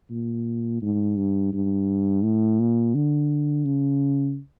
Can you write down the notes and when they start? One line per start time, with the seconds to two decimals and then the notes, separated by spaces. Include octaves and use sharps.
0.10 A#2
0.81 G#2
1.17 G2
1.53 G2
2.23 A2
2.60 A#2
2.95 D3
3.65 C#3